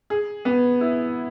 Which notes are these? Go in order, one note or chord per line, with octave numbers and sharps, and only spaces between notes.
G#4
B3
E4